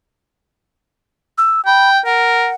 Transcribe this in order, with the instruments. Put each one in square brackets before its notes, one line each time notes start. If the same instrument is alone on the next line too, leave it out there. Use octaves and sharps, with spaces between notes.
[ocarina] E6
[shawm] G5 [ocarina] B5
[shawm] A#4 [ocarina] F#5